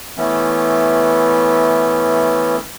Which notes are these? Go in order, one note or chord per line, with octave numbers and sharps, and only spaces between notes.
E3 A3 B3 C#4